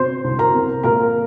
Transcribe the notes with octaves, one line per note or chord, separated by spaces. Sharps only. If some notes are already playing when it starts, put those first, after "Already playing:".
Already playing: C3 C5 C6
C2
A#4 A#5
C3
A#2 A#4 A#5